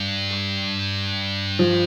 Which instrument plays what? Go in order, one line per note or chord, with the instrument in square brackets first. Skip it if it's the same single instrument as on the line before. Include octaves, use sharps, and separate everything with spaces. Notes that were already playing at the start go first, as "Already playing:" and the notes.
Already playing: [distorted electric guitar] G2
[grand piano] F3